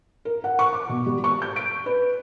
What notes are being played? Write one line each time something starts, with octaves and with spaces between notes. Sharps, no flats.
A#4
F#5
C#6
D6
B2
G3
C#6
G6
D7
B4